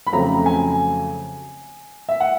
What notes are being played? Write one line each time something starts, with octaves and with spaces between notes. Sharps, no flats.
B5
F2 C#3 F#3 A3 C4 A#5
G#5
E5
F#5